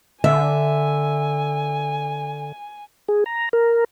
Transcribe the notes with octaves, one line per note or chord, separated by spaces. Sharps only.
D3 E5 G#5
G#4
A#5
A#4